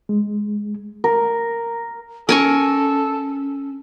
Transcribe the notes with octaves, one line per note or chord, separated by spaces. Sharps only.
G#3
A#4
C#4 A4 A#4 G#5 C#6